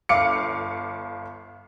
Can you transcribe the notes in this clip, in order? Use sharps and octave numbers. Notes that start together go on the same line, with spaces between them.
G1 F5 D6 C#7